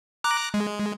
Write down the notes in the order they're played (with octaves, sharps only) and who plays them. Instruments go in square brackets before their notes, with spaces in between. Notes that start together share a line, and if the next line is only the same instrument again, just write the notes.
[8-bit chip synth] A#5 D6 F#6
G#3